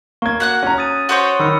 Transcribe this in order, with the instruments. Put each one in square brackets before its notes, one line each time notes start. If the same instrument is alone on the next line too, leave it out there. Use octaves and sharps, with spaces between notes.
[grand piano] A#3 G#6 [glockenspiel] C#6
[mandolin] F#4 F#5 F#6
[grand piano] C#4 A#5
[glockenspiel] D#6 A6 D#7
[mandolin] F#4 C5 C#5
[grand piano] D#3 [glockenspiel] B5 E6 C#7